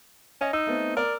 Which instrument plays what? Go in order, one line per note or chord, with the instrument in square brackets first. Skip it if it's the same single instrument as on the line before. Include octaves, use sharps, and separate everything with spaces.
[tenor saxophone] C#4 [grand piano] D#5
[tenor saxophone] D#4 [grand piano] E6
[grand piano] A3 B3 C4
[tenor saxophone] A#4 [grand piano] D5